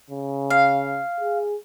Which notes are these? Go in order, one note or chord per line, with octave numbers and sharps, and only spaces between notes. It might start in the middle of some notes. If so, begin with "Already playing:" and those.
C#3
F5
G#4